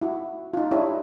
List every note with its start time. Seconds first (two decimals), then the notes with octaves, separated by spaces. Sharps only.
0.02 E4 F#4
0.53 D#4 F4
0.71 D4 E4 G4 C#5